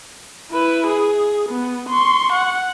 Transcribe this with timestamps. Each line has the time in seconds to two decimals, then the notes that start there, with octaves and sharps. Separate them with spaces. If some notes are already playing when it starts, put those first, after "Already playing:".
0.51 E4 B4
0.87 G#4
1.50 B3
1.89 C6 C#6
2.33 F#5